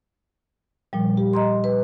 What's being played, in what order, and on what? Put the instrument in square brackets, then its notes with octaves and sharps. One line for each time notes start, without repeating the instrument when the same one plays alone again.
[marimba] A#2 F3 G3
G4
D#5 A#5 C6
B4